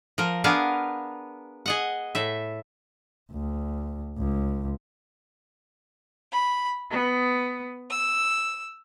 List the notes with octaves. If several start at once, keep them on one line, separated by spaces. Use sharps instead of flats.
F3 A#4
B3 D4 G#4 A#4 F5
G#4 D#5 F#5
A2 E5
D2
C#2
B5
B3
E6